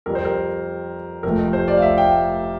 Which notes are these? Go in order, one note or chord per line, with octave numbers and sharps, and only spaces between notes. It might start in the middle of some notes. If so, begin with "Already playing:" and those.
F2 C3 G3 A#4
C5
A#4
F1 F2 C3 F3 A3 A#4
C5
D5
F5
E5
G5